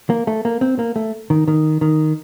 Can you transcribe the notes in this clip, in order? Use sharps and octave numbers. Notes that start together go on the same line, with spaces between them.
A#3
A3
A#3
C4
A#3
A3
D#3
D#3
D#3